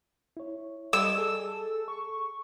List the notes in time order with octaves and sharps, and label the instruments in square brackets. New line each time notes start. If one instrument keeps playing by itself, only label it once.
[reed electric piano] E4 C#5
[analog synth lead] G3 [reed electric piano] A4 D#5 [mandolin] E6
[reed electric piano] G#4 [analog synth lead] A4
[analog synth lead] C#6